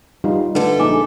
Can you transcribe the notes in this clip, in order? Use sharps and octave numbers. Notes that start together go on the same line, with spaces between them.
G3 D#4 F4
D3 A3 A4 B4
A#1 D#4 G#5 D6